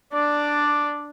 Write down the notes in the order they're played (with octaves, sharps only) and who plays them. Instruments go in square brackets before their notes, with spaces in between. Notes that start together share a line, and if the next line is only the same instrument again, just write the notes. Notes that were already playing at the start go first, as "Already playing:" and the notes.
[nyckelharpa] D4 [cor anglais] D5